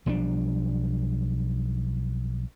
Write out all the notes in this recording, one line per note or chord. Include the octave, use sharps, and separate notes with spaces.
B1 F3 G3 D4